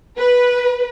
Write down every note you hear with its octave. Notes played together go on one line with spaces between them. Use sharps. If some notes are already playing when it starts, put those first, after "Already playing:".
B4